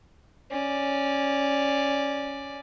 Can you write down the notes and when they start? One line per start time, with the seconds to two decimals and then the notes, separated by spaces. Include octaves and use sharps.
0.51 C#4 D5